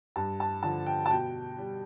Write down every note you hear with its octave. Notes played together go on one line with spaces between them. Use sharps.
G2 A5
A5
D3 F3 A5
G5
A5
B2 G5
G3